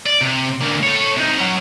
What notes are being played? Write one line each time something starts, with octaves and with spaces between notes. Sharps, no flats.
D5
C3
D3 A#3
A4 C#5
C3 D#4
F#3 C#4